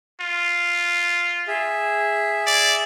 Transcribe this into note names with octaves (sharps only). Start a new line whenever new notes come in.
F4
G#4 E5
D5